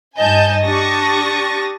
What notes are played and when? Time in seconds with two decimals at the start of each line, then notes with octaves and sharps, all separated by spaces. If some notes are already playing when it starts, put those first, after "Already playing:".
0.18 G2 D#4 D#5 G#5 A5 G6
0.63 D4 G4 C#6 D#6 A6 A#6